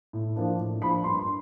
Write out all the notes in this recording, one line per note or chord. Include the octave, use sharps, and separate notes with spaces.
A2
F3 A#3 D4
A2
F3 A#3 D4 B5
G2 C6
C6